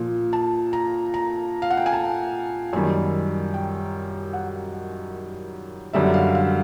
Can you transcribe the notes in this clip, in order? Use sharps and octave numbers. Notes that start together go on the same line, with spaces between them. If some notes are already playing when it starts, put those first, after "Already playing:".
Already playing: A#2 F3
A5
A#5
A#5
F5
F#5
G5
G#5
A5
F#2 D#3 G3 G#5
G5
F#5
F#2 D3 G3 E5
F5
F5